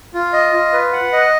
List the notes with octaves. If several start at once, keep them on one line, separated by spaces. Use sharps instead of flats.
F4
D#5
F4
B4
F#5
D#5